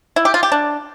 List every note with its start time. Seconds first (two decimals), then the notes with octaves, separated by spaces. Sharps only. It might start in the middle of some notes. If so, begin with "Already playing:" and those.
0.16 E4
0.25 G4
0.34 F4
0.43 G4
0.52 D4